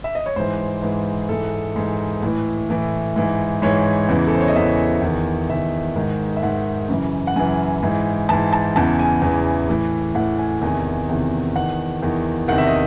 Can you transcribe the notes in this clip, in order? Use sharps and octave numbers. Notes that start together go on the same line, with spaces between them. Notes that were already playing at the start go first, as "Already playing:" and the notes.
E5
D#5
C#5
G#2 E3 C5
G#2 E3
G#2 E3 A4
G#2 E3
A2 E3
A2 E3
G#2 E3
G#2 E3 C#5
E2 C#3 E3
A4
C5
C#5
D#5
E2 C#3 E3 E5
E2 D#3
E2 D#3 E5
G#2 D#3
E5
G#2 D#3 F#5
F#2 C#3 E3
F#5
F#2 C#3 E3 G#5
G#2 E3
G#2 E3 A5
A5
E2 C#3 E3 A5
G#5
E2 C#3 E3
A2 E3
A2 E3 F#5
G#5
E2 C3 D#3 G#5
E2 C3 D#3
E2 D#3 F#5
E2 D#3
E2 C3 D#3 F#5
E5
D#5